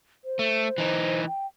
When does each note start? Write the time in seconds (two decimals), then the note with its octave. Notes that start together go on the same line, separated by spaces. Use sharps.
0.24 C5
0.39 A3
0.78 E3 D#4
1.26 G5